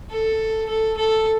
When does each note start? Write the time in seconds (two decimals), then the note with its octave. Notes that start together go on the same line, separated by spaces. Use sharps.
0.11 A4
0.69 A4
0.97 A4